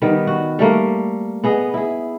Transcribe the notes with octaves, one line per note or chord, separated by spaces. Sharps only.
D#3 G3 B3
F#4
G3 A3 A#3
B3 G#4 D#5
E4 G#4